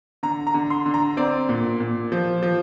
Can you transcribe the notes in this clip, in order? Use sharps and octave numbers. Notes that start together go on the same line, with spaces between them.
D3 A#5
A#5
D3
C6
D3
A#5
C4 D5
A#2
A#2
F3
F3